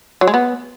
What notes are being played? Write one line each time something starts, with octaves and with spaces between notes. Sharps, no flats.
F#3
G#3
B3